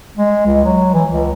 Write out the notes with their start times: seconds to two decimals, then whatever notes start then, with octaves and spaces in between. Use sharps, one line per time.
0.18 G#3
0.47 C#2
0.65 F#3
0.94 E3
1.11 C#2